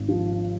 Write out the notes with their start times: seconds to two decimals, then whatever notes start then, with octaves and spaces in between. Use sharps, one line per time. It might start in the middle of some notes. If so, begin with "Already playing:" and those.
Already playing: G#1
0.09 F3